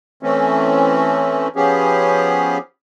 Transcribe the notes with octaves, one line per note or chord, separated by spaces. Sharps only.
E3 A3 C4 C#4
F3 B3 C#4 G4 G#4